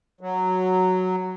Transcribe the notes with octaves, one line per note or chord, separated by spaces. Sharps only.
F#3